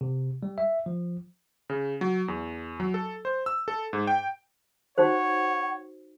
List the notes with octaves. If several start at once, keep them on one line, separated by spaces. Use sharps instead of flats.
C3
G3
E5
F3
C#3
F#3
E2
F#3
A4
C5
E6
A4
G#2
G5
D#4 F#4 C5 C#5 F#5